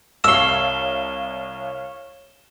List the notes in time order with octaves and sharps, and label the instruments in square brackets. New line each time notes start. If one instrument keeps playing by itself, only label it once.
[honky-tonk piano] C2 C7 [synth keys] C#5 F5 [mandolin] A5 E6 [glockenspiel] E7 G7